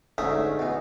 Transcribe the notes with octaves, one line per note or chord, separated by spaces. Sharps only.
D2 G#2 A3 C#4 E5 D#6
B2 E3